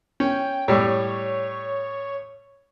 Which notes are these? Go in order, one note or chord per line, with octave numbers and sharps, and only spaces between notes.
C#4 G5
A2 G3 C#5